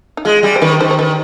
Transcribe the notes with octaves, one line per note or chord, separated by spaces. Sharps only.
D#4
G#3 F4
G3 G#4
C5
D#3 B4
D#3 C5
C5
D#3 B4